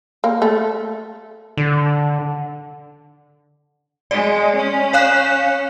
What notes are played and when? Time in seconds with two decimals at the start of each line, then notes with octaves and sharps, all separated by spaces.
0.24 A#3
0.42 A3
1.57 D3
4.11 G#3 D5
4.56 C#4
4.93 C#5 F5 F#6